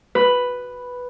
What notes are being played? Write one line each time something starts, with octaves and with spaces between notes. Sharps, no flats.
B4